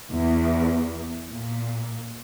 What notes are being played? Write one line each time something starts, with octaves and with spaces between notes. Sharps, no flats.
E2
A#2